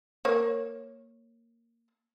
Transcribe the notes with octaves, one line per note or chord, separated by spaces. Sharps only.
A#3 C#5